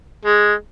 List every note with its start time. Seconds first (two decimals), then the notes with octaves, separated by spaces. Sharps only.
0.25 G#3